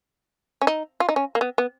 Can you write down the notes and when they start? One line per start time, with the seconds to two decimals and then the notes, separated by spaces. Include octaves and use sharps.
0.61 C#4
0.67 D#4
1.00 F4
1.09 D#4
1.16 C#4
1.35 A#3
1.41 B3
1.58 B3